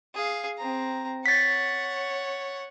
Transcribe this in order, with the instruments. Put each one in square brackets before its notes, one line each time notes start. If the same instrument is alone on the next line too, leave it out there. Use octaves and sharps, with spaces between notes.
[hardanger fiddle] G#4 F5
C4 A#5
[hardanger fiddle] C#5 F#5 [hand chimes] A6 B6